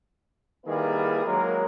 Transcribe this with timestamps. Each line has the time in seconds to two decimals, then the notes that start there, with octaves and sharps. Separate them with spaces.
0.65 D#3 G3 A#3 E4 G#4 B4
1.25 F#3 G#3 A#3 A#4